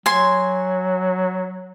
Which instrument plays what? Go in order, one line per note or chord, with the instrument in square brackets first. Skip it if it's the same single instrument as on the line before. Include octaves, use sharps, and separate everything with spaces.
[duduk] F#3 [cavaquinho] G#5 C6